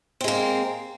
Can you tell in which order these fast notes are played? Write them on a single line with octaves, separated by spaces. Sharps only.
C4 G#3 A#3